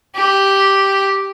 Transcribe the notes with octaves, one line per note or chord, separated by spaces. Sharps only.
G4